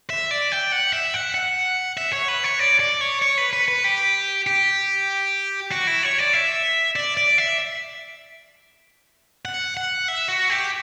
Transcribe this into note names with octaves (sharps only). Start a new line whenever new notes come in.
E5
D5
G5
F#5
E5
F#5
F#5
E5
C#5
B4
C#5
D5
D5
C#5
C#5
B4
B4
B4
G4
G4
F#4
E4
C#5
D5
E5
D5
D5
E5
F#5
F#5
E5
F#4
G4